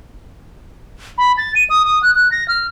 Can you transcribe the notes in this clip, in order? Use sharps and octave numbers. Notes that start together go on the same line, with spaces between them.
B5
A6
D#7
D#6
D#6
F#6
F#6
A#6
F6